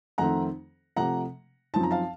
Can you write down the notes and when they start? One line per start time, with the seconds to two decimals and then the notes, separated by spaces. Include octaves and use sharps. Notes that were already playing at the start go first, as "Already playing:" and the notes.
0.18 F2 D#3 A3 C4 F#5 A#5
0.97 C3 F3 A3 F#5 A#5
1.74 F#2 F3 C4 D#4 A5
1.83 A#5
1.91 F5 A5